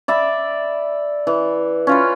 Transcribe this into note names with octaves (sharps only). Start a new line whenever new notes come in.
D5 E5 B5
E3
C#4 F4 B4